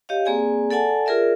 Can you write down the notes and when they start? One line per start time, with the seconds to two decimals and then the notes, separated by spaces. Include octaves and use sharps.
0.09 G4 C#5 D#5 F5
0.25 A#3 C4 G#4 D5 G#5
0.71 A4 D5 F#5 G#5 A5
1.06 F4 G#4 A#4 D5 E5